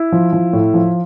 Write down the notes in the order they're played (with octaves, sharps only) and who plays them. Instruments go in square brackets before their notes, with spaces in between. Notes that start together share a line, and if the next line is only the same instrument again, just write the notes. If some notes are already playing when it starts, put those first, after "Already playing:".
Already playing: [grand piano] E4
F3
F3
A2
F3